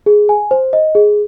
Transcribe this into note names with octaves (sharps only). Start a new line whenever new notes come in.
G#4
G#5
C5
D#5
G#4